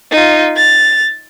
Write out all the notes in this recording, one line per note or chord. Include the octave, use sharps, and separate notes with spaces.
D#4 F4
A6 F7